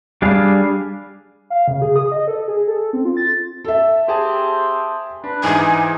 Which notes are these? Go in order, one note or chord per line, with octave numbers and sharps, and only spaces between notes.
G3 D4 G#4 F5
F5
C#3
G#4
D#6
D#5
A4
G#4
A4
C4
F4
A6
A4 E5
C4 G4 G#4 A5
D4 B4
G#2 E3 D#4 G#5